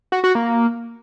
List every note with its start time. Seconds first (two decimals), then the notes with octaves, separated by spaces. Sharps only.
0.12 F#4
0.24 F#4
0.35 A#3